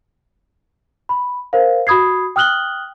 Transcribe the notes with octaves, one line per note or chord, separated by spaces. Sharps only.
B5
A#4 C5 F5
F#4 B5 D#6 G#6 C7
G5 D#6 F6 F#6 F#7 G7